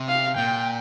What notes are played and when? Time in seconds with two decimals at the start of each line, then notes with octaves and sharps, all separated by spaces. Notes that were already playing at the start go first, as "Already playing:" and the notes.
Already playing: C3
0.08 F5
0.37 A#2 G5